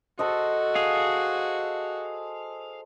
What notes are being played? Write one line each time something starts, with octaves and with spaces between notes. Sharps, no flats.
F#4 A4 C5 D#5
G#4 F5